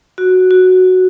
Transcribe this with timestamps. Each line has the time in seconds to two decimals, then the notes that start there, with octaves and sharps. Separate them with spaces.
0.18 F#4
0.51 F#4